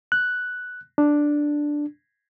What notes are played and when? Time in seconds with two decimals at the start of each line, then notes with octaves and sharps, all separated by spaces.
0.12 F#6
0.98 D4